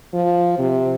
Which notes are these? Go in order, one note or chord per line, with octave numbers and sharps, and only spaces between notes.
F3
C3